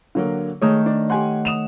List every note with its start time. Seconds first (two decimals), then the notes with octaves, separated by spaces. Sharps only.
0.15 D3 F#3 A#3
0.62 D#3 G#3 A3 C#5 D#6
0.86 D4
1.10 G4 F#5 G#5 C6
1.45 D#6 E7 F7